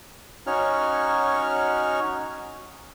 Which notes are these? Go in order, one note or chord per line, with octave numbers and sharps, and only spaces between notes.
C#4 D#4 F#4 C#5 F6